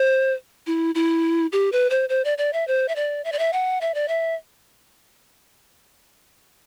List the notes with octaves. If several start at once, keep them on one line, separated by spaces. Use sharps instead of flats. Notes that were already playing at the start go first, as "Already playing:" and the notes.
Already playing: C5
E4
E4
G4
B4
C5
C5
D5
D5
E5
C5
E5
D5
E5
D5
E5
F#5
E5
D5
E5